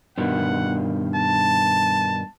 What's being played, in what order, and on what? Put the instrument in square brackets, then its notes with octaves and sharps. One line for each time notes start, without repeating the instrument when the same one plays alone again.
[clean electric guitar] G2 B2 D#3 [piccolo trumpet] F#5
[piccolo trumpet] A5